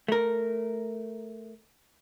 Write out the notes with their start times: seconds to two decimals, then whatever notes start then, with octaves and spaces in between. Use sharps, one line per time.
0.08 A3 A#4